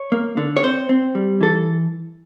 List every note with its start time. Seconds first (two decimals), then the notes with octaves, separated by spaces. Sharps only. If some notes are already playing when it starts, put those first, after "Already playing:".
Already playing: C#5
0.12 A#3
0.37 D3
0.57 C#5
0.63 C4 C5
0.89 C4
1.15 G3
1.41 E3 A4